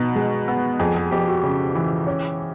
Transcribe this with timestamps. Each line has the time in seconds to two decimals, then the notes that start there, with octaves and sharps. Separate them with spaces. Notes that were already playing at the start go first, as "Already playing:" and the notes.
Already playing: B2 D#4 F#4
0.16 G#3
0.48 B3
0.79 F2 G#4
0.96 G#4
1.11 F2 G4
1.28 F#4
1.43 C#3
1.75 E3
2.07 C#4